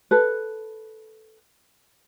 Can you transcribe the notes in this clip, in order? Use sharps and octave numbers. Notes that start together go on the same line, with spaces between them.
A4 B4